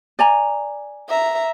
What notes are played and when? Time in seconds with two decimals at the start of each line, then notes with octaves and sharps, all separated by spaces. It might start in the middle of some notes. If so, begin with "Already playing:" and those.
0.19 D5 G#5 A#5
1.09 E5 A#5